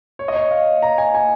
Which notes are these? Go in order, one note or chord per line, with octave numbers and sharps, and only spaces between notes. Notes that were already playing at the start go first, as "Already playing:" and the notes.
C#5
D#5
C#5
F5
A#5
G#5
G#5